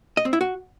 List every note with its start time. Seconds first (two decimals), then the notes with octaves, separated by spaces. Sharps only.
0.17 D#5
0.25 C4
0.33 E4
0.41 F#4